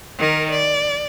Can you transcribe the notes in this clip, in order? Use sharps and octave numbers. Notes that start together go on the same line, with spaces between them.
D#3 A#4
D5